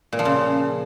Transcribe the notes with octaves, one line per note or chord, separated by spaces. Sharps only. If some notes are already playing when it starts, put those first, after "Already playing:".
A#2
F3
C#3